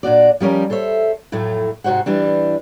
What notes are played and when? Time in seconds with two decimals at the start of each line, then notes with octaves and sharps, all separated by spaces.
0.03 A#2 D4 F#4 D5
0.40 F3 G3 C#4 A#4
0.70 A4 C5 C#5 E5
1.32 F2 A2 F#3 A3
1.84 G#2 C3 F#4 C5 F#5
2.06 E3 G3 D4